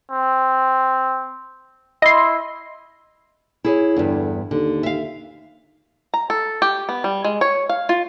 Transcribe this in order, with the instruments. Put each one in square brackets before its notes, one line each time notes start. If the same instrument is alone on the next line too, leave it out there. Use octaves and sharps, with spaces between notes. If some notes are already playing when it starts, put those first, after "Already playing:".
[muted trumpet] C4
[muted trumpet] E4 [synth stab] D#5 C6
[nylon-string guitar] E4 G#4 C#5
[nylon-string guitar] E2 G2 [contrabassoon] D3
[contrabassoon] D#2 [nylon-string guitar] D3
[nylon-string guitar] E5 F5
[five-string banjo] A#5
A4
G4
B3
G3
G#3
C#5
F5
F4